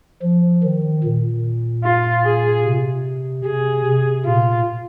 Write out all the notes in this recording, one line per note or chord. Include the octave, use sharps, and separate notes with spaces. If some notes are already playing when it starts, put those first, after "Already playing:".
F3
D#3
A#2
F4
G#4
C3
C3 G#4
C3
A#2 F4